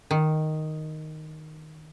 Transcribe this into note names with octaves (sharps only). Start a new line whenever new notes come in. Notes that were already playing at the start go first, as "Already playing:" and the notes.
D#3